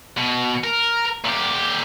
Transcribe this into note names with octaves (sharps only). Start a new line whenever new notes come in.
B2
A#4
A#2 G4